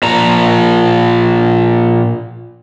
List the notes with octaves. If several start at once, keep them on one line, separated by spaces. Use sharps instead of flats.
A#2 F3 A#5